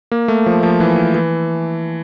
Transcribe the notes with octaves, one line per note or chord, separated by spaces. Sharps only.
A#3
A3
F3
F3
E3
E3